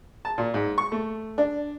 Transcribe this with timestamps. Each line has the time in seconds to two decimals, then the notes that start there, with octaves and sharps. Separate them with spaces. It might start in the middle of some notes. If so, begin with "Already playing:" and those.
0.25 A5
0.38 A#2
0.54 G#2
0.78 C#6
0.92 A3
1.38 D4